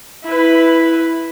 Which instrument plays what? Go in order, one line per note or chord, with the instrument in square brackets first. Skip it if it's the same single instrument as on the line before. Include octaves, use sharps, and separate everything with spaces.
[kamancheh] E4 B4